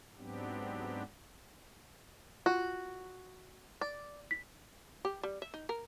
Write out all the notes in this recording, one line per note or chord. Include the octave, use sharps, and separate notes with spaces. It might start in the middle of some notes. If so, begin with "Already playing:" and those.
G#2 F#3 B3 C4 D4 G4
F4 F#4
D5
B6
G4
G3
E5
D#4
A#4